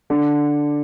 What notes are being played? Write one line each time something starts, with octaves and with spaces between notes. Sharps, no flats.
D3